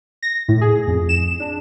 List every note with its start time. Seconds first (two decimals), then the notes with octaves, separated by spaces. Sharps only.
0.23 A#6
0.48 A2
0.61 G#4
0.88 F2
1.09 E7
1.40 D4